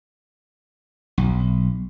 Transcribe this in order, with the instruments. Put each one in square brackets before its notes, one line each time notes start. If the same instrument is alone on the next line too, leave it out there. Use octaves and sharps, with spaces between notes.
[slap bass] B1